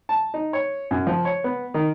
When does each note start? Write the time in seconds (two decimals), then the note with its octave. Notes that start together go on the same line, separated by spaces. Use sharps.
0.09 A5
0.34 D#4
0.53 C#5
0.91 F#2
1.07 F3
1.25 C#5
1.44 B3
1.74 D#3